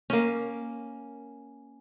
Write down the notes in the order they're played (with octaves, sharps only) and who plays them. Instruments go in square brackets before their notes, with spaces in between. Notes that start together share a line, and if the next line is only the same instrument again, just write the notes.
[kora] A#3 C#4